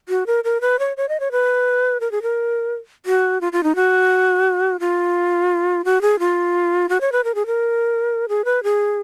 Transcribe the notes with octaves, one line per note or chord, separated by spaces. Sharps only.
F#4
A#4
A#4
B4
C#5
C#5
D#5
C#5
B4
A#4
G#4
A#4
F#4
F4
F4
D#4
F#4
F4
F#4
G#4
F4
F#4
C#5
B4
A#4
G#4
A#4
G#4
B4
G#4